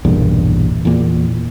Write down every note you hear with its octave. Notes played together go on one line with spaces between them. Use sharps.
B1 E2 G2 A#2
E2 A#2